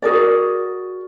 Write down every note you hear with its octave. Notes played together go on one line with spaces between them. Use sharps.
F#4 G#4 A#4 D5